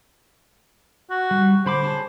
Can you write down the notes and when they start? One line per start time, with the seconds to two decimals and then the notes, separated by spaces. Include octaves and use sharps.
1.10 F#4
1.31 G3
1.66 D3 C5 B5 D6
1.84 G#4 C#5 A5